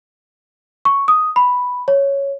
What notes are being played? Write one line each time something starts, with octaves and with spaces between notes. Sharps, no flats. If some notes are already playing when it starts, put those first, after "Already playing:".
C#6
D#6
B5
C#5